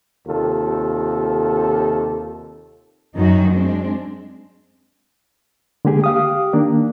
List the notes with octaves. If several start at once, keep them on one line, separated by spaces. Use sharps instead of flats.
D#2 C3 F4 A4
F#2 D#3 D#4 F#4
G#3 C4 D4
D3 G#3 A#3 G4 G#4
G4 F5 D#6
D#3 A#3 D4